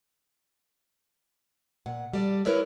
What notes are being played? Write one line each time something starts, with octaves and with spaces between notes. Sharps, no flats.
A#2 F#5
G3 A4 D5
E4 A#4 B4 C#5 D5